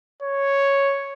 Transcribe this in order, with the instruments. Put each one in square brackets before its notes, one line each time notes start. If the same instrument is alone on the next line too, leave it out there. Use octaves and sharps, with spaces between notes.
[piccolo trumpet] C#5